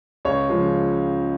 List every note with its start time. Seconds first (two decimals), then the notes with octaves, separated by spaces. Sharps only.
0.25 C#2 C#5
0.49 C#3 F3 G#3